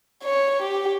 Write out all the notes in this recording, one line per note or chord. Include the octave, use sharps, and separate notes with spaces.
C#5
G4